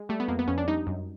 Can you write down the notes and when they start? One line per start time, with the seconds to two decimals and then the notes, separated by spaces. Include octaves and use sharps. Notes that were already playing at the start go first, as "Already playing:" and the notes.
Already playing: G#3
0.09 G3 A3
0.20 B3
0.28 F2 A#3
0.39 B3
0.48 F2 C#4
0.58 D4
0.68 G3 D#4
0.87 F#2